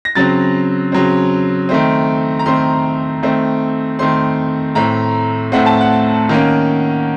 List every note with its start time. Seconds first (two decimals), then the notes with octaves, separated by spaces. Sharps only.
0.05 A#6
0.15 C#3 F#3 C4 A6
0.92 C#3 F#3 C4
1.69 D#3 A3 C4
2.39 A#5
2.46 D#3 A3 C4 C6
3.23 D#3 A3 C4
3.99 D#3 A3 C4 C6
4.75 A2 A3 C4 A#5
5.52 A2 A3 C4 F#5
5.66 A5
5.81 F#5
6.29 D#3 A#3 C#4